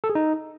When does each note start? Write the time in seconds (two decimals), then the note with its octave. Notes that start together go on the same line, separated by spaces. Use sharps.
0.04 A4
0.09 G#4
0.15 D#4